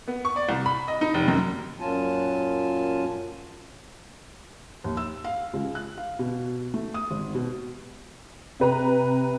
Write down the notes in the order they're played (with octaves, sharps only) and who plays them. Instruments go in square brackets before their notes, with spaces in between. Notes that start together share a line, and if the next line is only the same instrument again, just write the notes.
[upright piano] B3
C#6
D5
C2
B5
D#5
D#4
F1
F#2
[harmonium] F#2 A#2 F#3 F4 G#5 A5
[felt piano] D#2
E6
F5
C#2
F#6
F5
B2
A3
D#6
G#1
B2
[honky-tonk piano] C3 B4 A#5